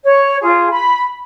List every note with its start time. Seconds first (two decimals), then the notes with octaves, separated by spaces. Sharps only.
0.03 C#5
0.41 F4 G#4
0.70 B5